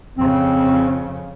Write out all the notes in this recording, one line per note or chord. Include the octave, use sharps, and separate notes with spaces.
F2 C#3 C4